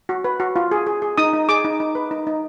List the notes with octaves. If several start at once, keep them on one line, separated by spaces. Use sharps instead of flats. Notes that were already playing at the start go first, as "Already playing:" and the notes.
F#4
B4
F#4
F4
G#4
G#4
G#4
D#4 D#6
D#4
G#4 D6
D#4
D#4
B4
D#4
D#4